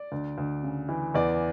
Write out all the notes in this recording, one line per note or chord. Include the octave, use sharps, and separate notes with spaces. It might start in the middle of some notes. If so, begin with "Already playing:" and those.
Already playing: D5
D2
D2
C#3
E3
E2 D5